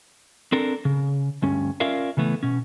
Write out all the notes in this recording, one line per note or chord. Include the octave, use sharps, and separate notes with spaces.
C4 D4 A4 A#4
C#3
D2 G2 C#4
C#4 F4 A#4 D5 E5 F5
C#3 E3 A3 B3
B2 C#4